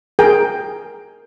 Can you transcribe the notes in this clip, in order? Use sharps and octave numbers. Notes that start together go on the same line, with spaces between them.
G#4 A#4 G5